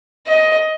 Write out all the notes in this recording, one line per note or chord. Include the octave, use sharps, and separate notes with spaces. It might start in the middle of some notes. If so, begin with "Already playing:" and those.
D#5